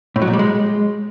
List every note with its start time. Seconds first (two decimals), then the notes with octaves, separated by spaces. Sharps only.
0.16 A2
0.22 F#3
0.27 A#2
0.33 G3
0.39 G#3